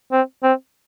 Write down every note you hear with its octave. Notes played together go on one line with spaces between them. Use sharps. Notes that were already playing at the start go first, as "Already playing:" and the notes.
C4
C4